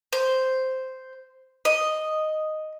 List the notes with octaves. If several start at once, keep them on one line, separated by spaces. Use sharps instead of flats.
C5
D#5